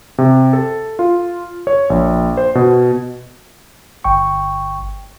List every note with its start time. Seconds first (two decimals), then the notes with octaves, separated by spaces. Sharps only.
0.18 C3
0.53 A4
0.99 F4
1.67 C#5
1.90 A#1
2.37 C5
2.55 B2
4.04 G1 G5 C#6